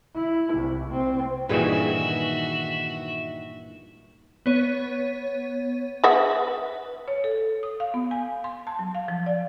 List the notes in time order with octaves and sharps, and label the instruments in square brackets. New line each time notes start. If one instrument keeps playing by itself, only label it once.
[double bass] E4
C2
C4
[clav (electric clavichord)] G2 A#2 E3 [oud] D#3 G#4 B4 [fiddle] F#4 E5
[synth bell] B3 C#5 D#7
[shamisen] G#4 E5 F#5 [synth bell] B4
[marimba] C#5
A4
D#6
F5
B3
G#5
C6
A5
F#3
F5
F3
D5